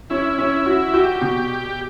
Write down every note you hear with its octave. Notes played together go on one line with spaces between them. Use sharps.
C#4 E4
C#4
F#4
F#4 G4
B2